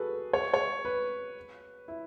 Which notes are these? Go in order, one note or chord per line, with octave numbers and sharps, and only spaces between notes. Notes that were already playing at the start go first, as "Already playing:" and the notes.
Already playing: F#4 G#4 A4 B4
C#5
C#5
B4
E4